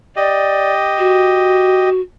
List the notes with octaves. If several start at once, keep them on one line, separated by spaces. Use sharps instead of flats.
G4 D5 D#5
F#4